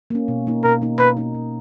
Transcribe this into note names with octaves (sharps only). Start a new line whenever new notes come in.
A#3 C#4
B2
A#3 D#4
B2 A#4
A#3 D#4
B2 B4
A#3 D#4
B2